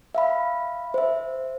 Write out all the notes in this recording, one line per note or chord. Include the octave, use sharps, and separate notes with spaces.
E5 F5 B5
C5 E5